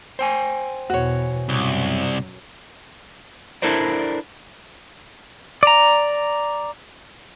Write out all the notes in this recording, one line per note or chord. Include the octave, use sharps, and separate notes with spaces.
C5 G5 G#5
E2 B2 E3 F#4 C#5
C2 F#2 B2 F#3
D4 E4 A4 A#4 C5 D5
D5 A#5